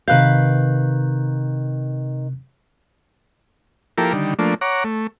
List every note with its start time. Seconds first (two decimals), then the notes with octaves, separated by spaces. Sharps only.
0.08 C3 D#3 B4 F5 F#6 G6
3.98 F3 A#3 E4 G4 A4 A#4
4.13 D3 D#3 G3
4.39 F3 A3 A#3 D4
4.61 C#5 F#5 A#5 D6
4.84 A3